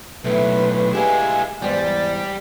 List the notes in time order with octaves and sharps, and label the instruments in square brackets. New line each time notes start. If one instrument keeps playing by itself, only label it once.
[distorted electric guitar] B1 A2 [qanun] A3 D4 [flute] B4
[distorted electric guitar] G#3 E4 [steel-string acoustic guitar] G4 G#4 F5
[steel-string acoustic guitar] E2 G#2 [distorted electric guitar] G3 [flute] D5